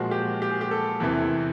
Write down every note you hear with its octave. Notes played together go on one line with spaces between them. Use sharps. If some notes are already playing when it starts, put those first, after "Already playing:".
Already playing: A#2 F3 G#3 F#4
G4
G4
G#4
G4
A4
E2 C3 E3